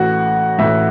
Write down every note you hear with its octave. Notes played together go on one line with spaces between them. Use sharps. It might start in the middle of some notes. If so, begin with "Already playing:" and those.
Already playing: A1 A2 A3 F#4
A1 A2 A3 E5